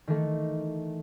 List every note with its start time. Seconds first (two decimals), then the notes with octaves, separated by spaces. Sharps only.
0.07 D#3 E3 A3